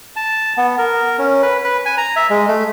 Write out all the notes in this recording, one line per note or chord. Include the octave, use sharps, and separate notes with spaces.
A5
B3
A#4
C#4
B4
B4
G#5
A#5
E5
G#3
A3